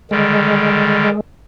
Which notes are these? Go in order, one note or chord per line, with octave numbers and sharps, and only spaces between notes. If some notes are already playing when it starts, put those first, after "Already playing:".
D3 D#3 G3 G#3